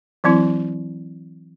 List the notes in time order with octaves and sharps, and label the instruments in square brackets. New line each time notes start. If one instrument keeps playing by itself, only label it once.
[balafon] E3 F#3 C4 E4